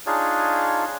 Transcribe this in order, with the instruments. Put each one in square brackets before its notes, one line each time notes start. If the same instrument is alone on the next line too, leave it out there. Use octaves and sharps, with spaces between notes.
[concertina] D4 D#4 F4 G#4 C#5